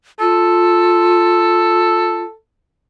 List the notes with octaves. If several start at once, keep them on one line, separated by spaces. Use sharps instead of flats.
F4 A4